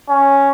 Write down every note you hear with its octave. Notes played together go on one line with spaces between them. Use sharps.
C#4